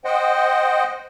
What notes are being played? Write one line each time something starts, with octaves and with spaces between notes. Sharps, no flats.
C5 D#5 F#5 G5